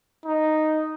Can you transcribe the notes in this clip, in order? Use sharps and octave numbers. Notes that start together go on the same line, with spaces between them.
D#4